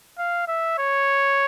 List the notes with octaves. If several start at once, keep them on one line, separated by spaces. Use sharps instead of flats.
F5
E5
C#5